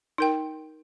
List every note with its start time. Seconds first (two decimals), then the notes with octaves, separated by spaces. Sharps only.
0.18 D#4 A#4 G5